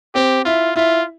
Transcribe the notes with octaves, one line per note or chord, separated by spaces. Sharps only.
C4 G4
E4 F4
E4 F4